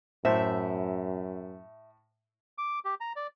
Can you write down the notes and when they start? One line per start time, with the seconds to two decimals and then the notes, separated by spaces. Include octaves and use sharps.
0.25 F#2 A2 C5 E5
2.58 D6
2.85 G4
3.00 A#5
3.16 D5